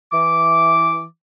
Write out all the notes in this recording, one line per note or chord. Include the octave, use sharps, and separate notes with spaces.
E3 D6